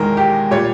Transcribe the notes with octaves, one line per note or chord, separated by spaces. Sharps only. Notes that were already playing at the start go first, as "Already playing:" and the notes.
Already playing: E1 E2 D#3 G#3 A#4
G4
A#2 G3 C#5